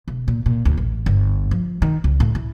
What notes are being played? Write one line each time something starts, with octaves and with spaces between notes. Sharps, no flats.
E1
A#2
A#2
D2
A1
G1
F3
D#3
C#2
A2
E4